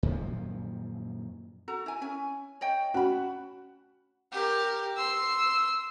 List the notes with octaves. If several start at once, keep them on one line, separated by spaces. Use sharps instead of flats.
F#2 A#2 D#3 F3
F#4 A4 A#5
E4 G#5
C#4 G#5
C#5 D#5 G5
C#4 F#4 B5
G4 A#4
C6 E6